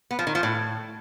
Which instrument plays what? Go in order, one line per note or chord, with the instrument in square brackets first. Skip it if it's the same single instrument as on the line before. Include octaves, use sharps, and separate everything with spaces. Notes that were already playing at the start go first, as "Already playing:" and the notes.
[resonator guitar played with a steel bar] B3
F3
D#3
F3
A2